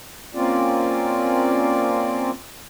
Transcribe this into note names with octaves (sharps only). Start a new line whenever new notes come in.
A#3 C4 C#4 F4 D5